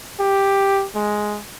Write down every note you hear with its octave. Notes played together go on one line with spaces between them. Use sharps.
G4
G#3